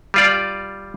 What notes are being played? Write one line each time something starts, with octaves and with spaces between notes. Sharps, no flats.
G3 F4 D5